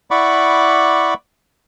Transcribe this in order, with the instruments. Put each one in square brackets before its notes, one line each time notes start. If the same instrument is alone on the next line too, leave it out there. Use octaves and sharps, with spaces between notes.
[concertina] E4 D5 F#5 B5 C#6 D6